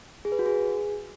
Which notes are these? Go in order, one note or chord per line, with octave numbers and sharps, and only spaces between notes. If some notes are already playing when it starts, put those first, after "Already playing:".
G#4
B4
F#4
G#4